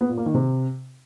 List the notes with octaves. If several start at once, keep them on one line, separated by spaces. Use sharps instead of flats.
B3
A#2
A#3
D#3
C3